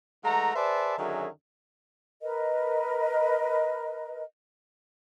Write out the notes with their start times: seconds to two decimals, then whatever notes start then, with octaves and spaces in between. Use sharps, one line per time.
0.24 E3 G#3 A3 F#5 A#5
0.55 G#4 B4 C5 D5 E5 A5
0.98 F#2 D3 D#3 F#3 G#4 E5
2.22 A#4 B4 D#5